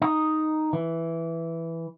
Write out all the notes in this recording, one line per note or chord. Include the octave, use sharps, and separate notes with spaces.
D#4
E3